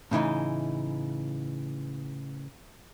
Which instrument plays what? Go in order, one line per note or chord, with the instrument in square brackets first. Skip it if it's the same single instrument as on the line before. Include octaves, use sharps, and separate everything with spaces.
[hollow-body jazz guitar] A2 C#3 E3 D#4